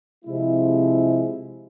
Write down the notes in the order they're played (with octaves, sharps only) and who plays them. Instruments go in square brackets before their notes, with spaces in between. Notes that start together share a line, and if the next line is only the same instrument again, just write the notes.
[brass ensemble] C3 F3 G#3 E4